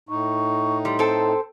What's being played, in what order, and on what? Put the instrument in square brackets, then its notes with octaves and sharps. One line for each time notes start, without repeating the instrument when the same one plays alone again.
[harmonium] A2 D#4 [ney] C#6
[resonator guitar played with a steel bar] G3 [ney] C6
[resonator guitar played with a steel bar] C4 A4